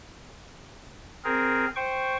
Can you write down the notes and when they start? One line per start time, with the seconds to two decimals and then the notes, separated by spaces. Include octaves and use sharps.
1.24 C4 G#4 A#4
1.76 C5 G5 C#6